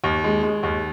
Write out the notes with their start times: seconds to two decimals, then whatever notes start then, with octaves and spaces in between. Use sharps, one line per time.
0.04 D#2
0.24 G#3
0.43 G#3
0.63 D#2